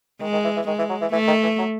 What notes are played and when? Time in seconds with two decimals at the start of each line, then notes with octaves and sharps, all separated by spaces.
0.21 D#3 G#3
0.33 D#3
0.44 E3
0.56 E3
0.67 D#3 G#3
0.79 E3
0.90 F#3
1.02 E3
1.13 E3 A3
1.28 D#3
1.43 E3
1.58 F#3